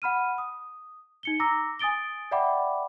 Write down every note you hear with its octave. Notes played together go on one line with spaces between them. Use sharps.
F#5 B5 F6 D#7
D#6
D#4 C#7 G7
A#5 D6 E6 A#6
G#5 D#6 A6 D7 G7
D5 E5 F#5 G5 B5 D6